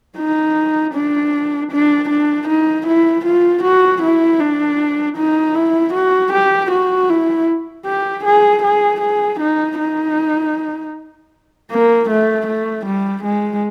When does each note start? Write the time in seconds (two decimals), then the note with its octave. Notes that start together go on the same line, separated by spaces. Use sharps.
0.17 D#4
0.94 D4
1.72 D4
2.09 D4
2.48 D#4
2.87 E4
3.25 F4
3.63 F#4
4.02 E4
4.40 D4
5.17 D#4
5.55 E4
5.94 F#4
6.33 G4
6.71 F#4
7.09 E4
7.85 G4
8.24 G#4
8.63 G#4
9.01 G#4
9.40 D#4
9.78 D#4
11.71 A#3
12.09 A3
12.47 A3
12.86 G3
13.24 G#3